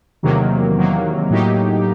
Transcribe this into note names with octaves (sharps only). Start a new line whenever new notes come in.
E2 C3 D#3 F#3 A#3
E2 C3 D#3 F#3 A#3
A2 F#3 A#3 D#4 G4